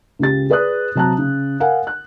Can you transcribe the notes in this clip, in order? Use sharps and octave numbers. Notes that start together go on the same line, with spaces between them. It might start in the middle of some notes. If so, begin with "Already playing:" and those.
C#2 C#3 G4 A6
G#4 B4 D5 D#6 F#6
C3 F#3 A5 A#5 F#6
C#3
A#4 F5 F#5 G#5
F#6